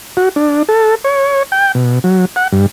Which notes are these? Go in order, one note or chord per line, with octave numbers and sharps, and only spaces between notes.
F#4
D4
A4
C#5
G5
B2
F#3
F#5
G2